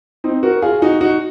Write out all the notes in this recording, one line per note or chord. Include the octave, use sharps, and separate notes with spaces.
C4 D#4
F#4 A#4
F4 G#4
D#4 F#4
D#4 F#4